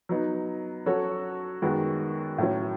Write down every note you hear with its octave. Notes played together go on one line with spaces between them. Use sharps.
F#3 B3 D#4
F#3 C#4 F#4 A4 C#5
F#2 D#3 G#3 B3 F#4
A2 F#3 C#4